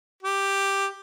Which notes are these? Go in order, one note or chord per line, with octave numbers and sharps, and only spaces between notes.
G4